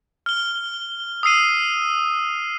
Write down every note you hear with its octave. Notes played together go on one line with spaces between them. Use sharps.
F6 G7
D#6 E6 C7 D#7